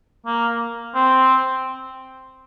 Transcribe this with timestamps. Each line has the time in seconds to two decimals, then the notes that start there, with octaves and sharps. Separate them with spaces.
0.26 A#3
0.95 C4